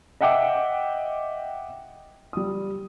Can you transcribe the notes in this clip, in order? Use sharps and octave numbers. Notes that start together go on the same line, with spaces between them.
D#5 E5 F#5 G5 D6
G3 D#6